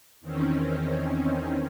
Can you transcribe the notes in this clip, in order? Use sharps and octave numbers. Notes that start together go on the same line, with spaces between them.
E2 D#3 C4 C#4